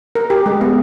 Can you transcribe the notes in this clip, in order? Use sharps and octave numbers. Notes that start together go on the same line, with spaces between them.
A#4
G4
G#3
B3